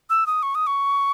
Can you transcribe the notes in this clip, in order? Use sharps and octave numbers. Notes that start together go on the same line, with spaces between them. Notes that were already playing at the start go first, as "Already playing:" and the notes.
E6
D#6
C#6
D#6
C#6